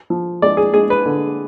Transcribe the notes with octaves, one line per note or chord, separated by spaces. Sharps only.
F3
G#3 D5
G#4
G#3 G#4
B4
D3